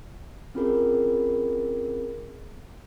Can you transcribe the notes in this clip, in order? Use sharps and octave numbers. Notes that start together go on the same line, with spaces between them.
C4 C#4 F4 G#4 A#4